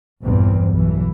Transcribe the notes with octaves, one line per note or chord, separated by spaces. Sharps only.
A#1 E2 G2 C4
B1 E3